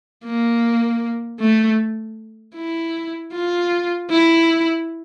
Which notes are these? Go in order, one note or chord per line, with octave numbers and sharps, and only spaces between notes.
A#3
A3
E4
F4
E4